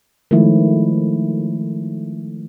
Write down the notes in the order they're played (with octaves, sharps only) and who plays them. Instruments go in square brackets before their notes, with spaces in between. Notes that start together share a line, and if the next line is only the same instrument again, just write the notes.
[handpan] D#3 F3 G#3 A3 E4